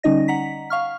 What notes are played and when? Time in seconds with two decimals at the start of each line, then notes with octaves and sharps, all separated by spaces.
0.03 D3 G3 C#4 D#4 D#5 A#6
0.28 F#5 A#5 B6
0.70 F5 C#6 F6